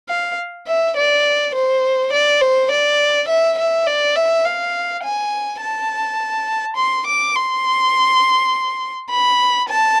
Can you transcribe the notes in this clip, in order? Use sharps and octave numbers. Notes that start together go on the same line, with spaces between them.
F5
E5
D5
C5
D5
C5
D5
E5
E5
D5
E5
F5
G#5
A5
C6
D6
C6
B5
A5